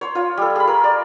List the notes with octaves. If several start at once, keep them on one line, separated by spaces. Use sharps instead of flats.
C5 C#5
F4 C#5
G3 A4
G#4 B5
A#4
D5